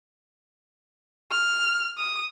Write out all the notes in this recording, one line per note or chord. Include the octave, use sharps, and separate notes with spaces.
F6
D#6